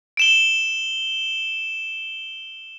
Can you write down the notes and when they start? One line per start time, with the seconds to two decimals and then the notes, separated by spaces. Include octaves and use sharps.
0.17 D7 E7 G7